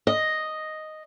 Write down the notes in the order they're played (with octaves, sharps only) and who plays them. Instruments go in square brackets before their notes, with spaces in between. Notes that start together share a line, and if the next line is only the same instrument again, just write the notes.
[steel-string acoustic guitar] D#5